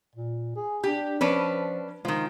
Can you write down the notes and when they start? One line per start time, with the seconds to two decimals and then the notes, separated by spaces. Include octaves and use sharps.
0.15 A#2
0.56 G#4
0.84 D4 G4
1.21 F3 C#4 D4 B4
2.05 D#3 F3 G#3